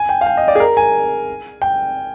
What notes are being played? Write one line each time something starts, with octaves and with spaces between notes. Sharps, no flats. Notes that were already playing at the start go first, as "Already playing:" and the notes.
Already playing: G#5
G5
F5
G5
D#5
D5
G#4
A#4
G#5
G5